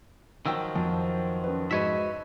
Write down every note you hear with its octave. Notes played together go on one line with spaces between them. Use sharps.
D#3 F3 F#3 G5 E6
F2
C#4 B4
G#2 F#4 B4 C#5 D#5 E5